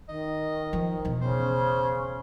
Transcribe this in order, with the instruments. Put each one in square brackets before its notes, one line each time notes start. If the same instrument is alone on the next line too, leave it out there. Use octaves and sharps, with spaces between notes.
[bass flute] D#3 [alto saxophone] D#5
[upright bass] F3
E2 B2
[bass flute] C#3 [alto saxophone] C5